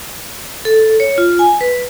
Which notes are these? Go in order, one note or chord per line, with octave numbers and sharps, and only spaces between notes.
A4
C#5
F4
G#5
B4